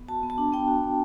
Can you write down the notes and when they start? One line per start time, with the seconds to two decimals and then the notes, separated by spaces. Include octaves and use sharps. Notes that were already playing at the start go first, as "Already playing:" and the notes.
Already playing: B3
0.08 F#4 A5
0.23 B3
0.30 A5
0.38 D4
0.53 B3 G5
0.68 F#4
0.84 B3